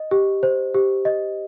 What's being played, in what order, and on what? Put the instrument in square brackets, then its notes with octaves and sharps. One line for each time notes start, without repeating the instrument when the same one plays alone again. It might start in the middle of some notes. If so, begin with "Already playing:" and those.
Already playing: [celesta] D#5
G4
C5
G4
D#5